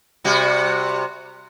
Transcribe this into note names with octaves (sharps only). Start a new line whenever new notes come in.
C3 G3 F#4